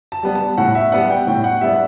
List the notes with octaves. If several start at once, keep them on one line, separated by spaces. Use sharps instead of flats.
A5
G3 B3 D4
A5
A2 F#5
E5
G3 B3 D4 F#5
G5
A2 G5
F#5
G3 B3 D4 E5